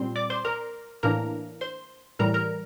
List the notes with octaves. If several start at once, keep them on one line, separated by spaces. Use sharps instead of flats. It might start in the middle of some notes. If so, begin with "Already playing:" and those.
Already playing: A#2 G3 C4 C5 C6
D5 D6
C5 C6
A#4 A#5
A2 E3 A#3 D4 A#4 A#5
C5 C6
A2 E3 G3 A#4 A#5
A#4 A#5